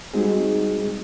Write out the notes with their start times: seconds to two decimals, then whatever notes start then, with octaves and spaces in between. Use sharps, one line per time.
0.14 G3 G#3 C4 D#4 F#4 G#4